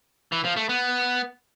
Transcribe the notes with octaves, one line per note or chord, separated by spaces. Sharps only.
E3
F3
A3
B3